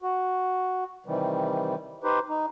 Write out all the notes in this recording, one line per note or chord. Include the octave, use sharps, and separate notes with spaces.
F#4
C3 D#3 E3 G3
D#4 G4 B4 C5
D#4